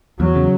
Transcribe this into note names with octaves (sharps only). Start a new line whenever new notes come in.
E2 F#3
C#3